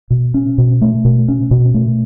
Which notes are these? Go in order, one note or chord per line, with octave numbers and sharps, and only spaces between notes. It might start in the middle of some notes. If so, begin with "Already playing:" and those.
B2
C#4
B2
A3
B2
C#4
B2
A3